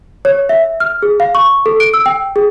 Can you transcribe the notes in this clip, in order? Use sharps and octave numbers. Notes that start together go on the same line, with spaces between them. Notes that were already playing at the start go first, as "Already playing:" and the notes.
C#5
E5
F6
G#4
F5
C#6
A4
D7
E6
G5
G#4